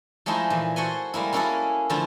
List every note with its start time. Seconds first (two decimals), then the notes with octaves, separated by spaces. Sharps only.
0.26 F3 G#3 A3 D#4 E4
0.50 A#2 E3
0.76 F#4 A4 C5 F#5 G#5 C6
1.14 G3 G#3 A#3 E4
1.33 A#3 C#4 E4 F#4 G#4 A4
1.90 D3 F3 A3 E4 F4